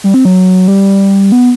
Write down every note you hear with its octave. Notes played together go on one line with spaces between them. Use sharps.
G3
C4
F#3
G3
B3